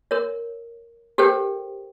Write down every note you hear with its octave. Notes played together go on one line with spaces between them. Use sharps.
A#4 C#5
G4 A4 A#4 C5 G5